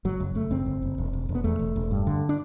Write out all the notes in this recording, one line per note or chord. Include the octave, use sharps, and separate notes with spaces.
F#1 F#3
F#1
F#1 A3
F#1 C4
F#1
F#1
E1
E1
E1
B3
E2 A3
E1
E1
G2
D3
D4